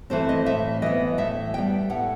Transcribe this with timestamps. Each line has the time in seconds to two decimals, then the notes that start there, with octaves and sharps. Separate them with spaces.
0.10 E3 A3 C4 C5
0.29 D#5
0.46 A2 E5
0.82 E3 B3 D#5
1.18 A2 E5
1.54 G3 B3 G5
1.90 A2 F#5